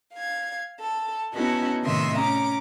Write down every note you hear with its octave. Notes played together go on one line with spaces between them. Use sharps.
F5 G#6
A4
B3 C#4 D#4 E4 F#4 A4
A2 C3 D#3 D#5 E5 C6
C#4 A#5 D6